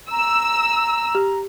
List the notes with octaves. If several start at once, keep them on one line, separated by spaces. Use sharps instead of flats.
A#5 E6
G4